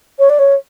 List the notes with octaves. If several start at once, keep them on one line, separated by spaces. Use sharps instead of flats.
C#5
D5
C#5